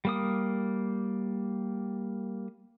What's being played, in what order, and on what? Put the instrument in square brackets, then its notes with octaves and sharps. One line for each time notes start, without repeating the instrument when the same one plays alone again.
[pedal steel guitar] G3 A#3 D#6